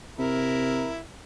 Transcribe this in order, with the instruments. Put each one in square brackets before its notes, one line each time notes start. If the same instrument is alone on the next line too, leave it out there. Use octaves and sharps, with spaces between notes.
[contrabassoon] C3 [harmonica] E4 A#4